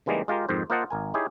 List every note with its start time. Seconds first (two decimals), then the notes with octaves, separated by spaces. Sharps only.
0.06 C#3 E3 G3 G#3 A#3 D#4
0.28 G#3 F4 G4 A#4
0.49 F2 G#2 D#3 C5
0.70 A#3 F4 C5 D#5 F#5 A5
0.90 G#1 A#4 G#5
1.14 D#4 E4 G4 G#4 C#5